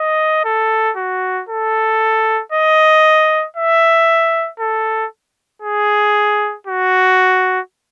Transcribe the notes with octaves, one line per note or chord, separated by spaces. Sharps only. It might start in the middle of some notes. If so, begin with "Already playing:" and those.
Already playing: D#5
A4
F#4
A4
D#5
E5
A4
G#4
F#4